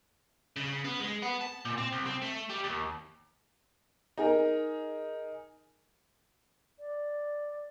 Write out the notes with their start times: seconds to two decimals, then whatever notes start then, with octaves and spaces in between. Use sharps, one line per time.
0.56 C#3
0.84 B3
1.00 G#3
1.22 B3
1.41 A5
1.65 A#2
1.78 C4
1.93 C2
2.07 C4
2.22 A3
2.49 G3
2.64 D#2
4.18 D#4 G#4 A#4
6.79 D5